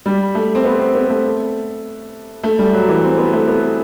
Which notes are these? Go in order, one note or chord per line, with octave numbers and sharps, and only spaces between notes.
G3
A3
C4
B3
C4
B3
A3
A3
G3
F#3
E3
C4
B3
A3
B3